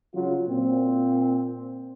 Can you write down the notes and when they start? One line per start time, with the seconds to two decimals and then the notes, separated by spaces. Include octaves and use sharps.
0.14 C#3 F#3 F4
0.49 A#2 C4